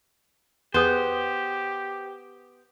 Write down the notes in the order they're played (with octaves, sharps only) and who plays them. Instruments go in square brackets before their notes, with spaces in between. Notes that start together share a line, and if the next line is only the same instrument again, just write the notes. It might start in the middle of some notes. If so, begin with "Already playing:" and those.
[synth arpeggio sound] E2 G#4 D#6 [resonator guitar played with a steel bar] B3 [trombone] G4 [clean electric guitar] C5